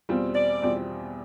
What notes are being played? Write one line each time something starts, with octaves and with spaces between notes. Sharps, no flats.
E2 B2 G3 C4 F4
D5
E2 B2 G3 C4 F4